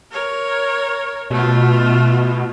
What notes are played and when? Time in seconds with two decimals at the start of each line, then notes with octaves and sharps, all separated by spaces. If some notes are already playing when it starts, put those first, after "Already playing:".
0.11 A#4 C#5
1.30 B2 A3 F4